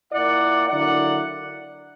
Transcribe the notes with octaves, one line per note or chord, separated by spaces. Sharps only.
A#2 A#3 E4 D5 F#5
D3 F#3 A#3 E4 D5 F#5